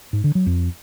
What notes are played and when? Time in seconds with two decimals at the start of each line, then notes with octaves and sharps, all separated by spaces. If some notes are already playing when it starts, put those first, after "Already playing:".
0.13 G#2
0.24 D3
0.35 F#3
0.46 F2